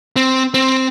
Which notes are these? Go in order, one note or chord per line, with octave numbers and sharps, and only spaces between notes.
C4
C4